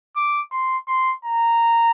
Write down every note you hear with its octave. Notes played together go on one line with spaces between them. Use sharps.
D6
C6
C6
A#5